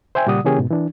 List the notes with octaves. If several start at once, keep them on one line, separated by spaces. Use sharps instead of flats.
C5 E5 G5 G#5
A#2 C#3 G3 D5 F#5 D#6
C#3 E3 A#3 C#4 G4 G#4
G#2 B2
E3 D4